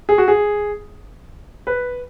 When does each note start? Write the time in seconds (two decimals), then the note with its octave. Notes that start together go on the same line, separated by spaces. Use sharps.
0.09 G#4
0.18 F#4
0.28 G#4
1.67 B4